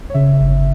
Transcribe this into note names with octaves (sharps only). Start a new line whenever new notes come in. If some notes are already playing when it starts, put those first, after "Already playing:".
C#5
C#3 E5
G1